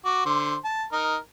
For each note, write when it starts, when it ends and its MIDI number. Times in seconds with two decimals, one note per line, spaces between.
0.05 0.25 66
0.05 0.25 86
0.26 0.55 50
0.26 0.55 72
0.64 0.83 81
0.92 1.16 63
0.92 1.16 70